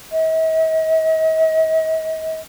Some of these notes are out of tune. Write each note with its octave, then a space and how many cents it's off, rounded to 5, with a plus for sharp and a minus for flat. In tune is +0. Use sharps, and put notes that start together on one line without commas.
D#5 +45